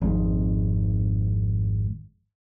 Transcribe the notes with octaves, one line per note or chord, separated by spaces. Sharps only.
G#1 F2 G#2